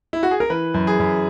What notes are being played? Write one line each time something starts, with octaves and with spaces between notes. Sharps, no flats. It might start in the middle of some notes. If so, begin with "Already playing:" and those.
E4
F#4
G#4
A#4
E3 B4
F#2
G#4
F#2